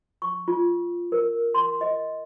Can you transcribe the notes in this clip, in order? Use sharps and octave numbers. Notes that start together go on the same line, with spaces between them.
C#6
F4
A#4
C6
D#5